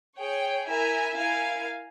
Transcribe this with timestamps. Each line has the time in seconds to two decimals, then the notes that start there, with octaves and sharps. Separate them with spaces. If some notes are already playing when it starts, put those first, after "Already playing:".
0.19 G#4 C#5 G5
0.67 E4 A#4 E5 G#5
1.16 E4 A#4 F5 G#5